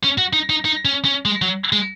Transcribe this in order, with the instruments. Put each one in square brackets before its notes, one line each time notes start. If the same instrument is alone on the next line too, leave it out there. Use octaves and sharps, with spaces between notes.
[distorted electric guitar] C#4
F#4
D#4
D#4
D#4
C#4
C#4
G#3
F#3
G#3